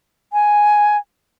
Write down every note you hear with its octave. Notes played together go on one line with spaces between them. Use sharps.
G#5